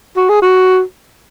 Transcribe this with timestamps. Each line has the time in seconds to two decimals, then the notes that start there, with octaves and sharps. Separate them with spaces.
0.17 F#4
0.29 G#4
0.42 F#4